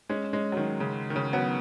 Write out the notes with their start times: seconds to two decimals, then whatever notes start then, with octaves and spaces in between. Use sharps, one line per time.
0.09 G#3 C#4
0.33 G#3 C#4
0.52 F#3
0.57 D#3
0.80 C#3
1.10 D#3
1.16 C#3
1.33 F#3 B3